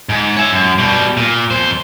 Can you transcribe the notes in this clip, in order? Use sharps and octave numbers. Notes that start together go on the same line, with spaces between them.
G#2
C#5 E5
F#2
B2 G3
A#2
F2 C5